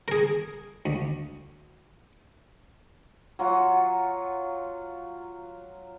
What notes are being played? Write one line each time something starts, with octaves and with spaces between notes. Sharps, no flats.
G#4 A#4
D2
F#3 F4 F#5